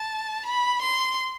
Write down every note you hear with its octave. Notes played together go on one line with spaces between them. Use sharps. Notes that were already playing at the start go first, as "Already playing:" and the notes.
Already playing: A5
B5
C6